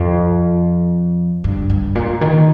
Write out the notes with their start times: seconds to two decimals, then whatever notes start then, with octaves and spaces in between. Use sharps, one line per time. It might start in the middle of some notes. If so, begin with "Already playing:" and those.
Already playing: F2
1.44 G2
1.70 G2
1.95 A#2
2.21 D#3